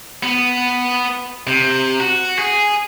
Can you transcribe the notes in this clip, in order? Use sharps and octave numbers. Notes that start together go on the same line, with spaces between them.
B3
C3
F#4
G#4